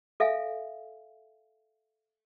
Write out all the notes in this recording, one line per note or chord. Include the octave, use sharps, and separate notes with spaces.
A4 E5 F5 G#5